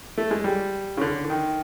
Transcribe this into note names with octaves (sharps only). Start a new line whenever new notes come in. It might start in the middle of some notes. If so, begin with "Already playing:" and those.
A3
G#3
G3
C#3
D3
D3
D#3